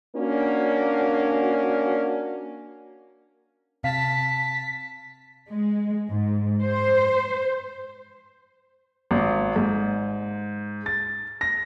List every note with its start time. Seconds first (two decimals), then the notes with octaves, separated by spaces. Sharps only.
0.15 A#3 C#4 D4 F#4
3.84 C3 F5 A5 B6
5.49 G#3
6.10 G#2
6.62 C5
9.11 G#1
9.56 G#2
10.86 A6
11.41 A#6